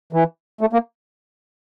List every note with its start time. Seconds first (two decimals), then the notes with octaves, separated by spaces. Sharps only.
0.13 E3
0.61 A3
0.73 A#3